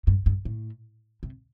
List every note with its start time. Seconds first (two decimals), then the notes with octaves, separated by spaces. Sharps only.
0.07 G2
0.26 G2
0.45 A2
1.23 C3